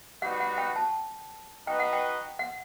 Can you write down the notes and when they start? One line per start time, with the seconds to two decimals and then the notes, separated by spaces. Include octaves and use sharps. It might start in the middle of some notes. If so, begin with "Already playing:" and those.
0.22 G3 D#4 F#4 B4 F#5
0.40 F#5
0.58 G5
0.76 A5
1.67 D#4 F#4 B4 D#5 G5
1.80 F#5
1.93 G5
2.39 F#5